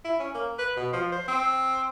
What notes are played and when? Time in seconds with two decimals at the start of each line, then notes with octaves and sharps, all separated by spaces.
0.05 E4
0.19 C#4
0.34 A#3
0.58 B4
0.77 B2
0.93 F3
1.12 C5
1.28 C4